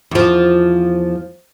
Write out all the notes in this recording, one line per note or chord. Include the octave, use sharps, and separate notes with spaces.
E2 F3